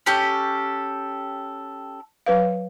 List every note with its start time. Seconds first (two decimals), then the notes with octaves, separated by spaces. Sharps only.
0.06 C#4 G4 A4
2.26 F#3 B4 F5